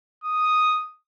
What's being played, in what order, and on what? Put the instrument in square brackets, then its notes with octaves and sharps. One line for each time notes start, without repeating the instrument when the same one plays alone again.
[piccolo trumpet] D#6